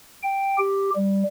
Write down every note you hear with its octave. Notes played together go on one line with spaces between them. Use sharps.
G5
G4
G3